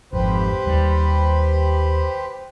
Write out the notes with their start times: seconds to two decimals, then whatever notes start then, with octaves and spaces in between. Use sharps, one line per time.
0.13 G#1 F2 G4 B4 C5
0.65 D#2 G3